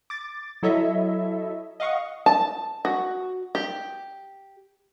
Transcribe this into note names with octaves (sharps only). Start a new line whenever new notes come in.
D6 A6
F#3 E4 A4 C#5 D#5 E5
D#5 F5 F#5 C#6 D#6
A5
F#4
G4